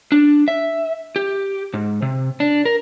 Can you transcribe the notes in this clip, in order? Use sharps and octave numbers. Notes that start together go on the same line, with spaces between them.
D4
E5
G4
G#2
C3
D4
A#4